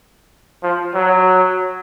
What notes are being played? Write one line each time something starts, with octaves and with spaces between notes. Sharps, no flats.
F3
F#3